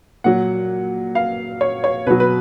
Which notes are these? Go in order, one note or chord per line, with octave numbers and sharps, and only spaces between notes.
A#2 F#3 F#5
F5
C#5
C#5
B2 F#3 B4
B4